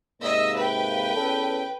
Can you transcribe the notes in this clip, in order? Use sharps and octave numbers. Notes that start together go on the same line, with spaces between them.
G#2 C3 A#3 D#5 E5 E6
B4 G5
E2 C#4 A4